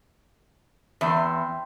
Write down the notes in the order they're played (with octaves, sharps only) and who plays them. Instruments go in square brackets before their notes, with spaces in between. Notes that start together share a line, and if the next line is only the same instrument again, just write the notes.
[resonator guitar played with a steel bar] E2 [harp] E5 G5 C6